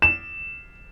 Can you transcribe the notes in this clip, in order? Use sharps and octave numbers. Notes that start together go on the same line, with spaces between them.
E7